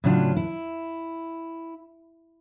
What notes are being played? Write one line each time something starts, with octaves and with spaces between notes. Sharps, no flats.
A2 C#3 F#3 D4 F4
E4